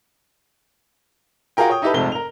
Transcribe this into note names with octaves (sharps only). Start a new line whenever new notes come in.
F4 F#4 G#4 A#4 G5
C#5 G5 D#6
D#4 E4 G4 A4 B4
F1 F2 G#2 C3 A3 G7
A#4 F7